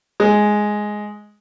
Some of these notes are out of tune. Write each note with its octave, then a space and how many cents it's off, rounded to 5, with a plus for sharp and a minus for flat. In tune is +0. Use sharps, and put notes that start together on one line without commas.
G#3 +5